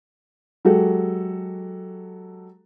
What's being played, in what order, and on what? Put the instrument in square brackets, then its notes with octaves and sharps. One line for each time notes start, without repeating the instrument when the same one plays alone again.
[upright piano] F#3 G#3 F#4 G4 A4